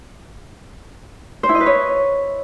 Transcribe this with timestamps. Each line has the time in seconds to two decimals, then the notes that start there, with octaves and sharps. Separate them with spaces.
1.43 C5
1.49 E4
1.55 D#5
1.60 B4
1.66 C#5